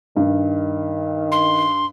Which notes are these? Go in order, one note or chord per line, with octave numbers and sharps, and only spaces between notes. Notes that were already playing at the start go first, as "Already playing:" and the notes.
G2 D#3
C6